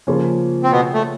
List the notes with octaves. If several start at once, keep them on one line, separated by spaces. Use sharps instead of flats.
C#3 F3 A#3 C#4 F4
C4
B2 B3
A3